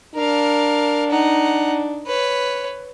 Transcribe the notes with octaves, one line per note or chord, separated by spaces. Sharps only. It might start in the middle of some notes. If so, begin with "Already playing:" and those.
D4 A#4 F5
D#4 F#5
B4 C#5